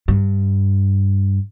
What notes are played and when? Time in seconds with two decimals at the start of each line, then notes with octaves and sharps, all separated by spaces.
0.08 G2